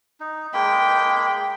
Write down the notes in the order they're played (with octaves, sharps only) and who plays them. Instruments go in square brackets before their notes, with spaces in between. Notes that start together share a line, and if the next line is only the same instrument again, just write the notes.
[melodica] D#4
[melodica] G#3 A#3 B5 [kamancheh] G5